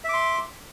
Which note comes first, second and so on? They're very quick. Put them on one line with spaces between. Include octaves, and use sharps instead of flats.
E5 D6 C6